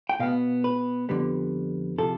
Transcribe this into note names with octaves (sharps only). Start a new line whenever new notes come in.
G5
B2 B3 F5
B4
F2 D3 G3 B3
C3 F3 A4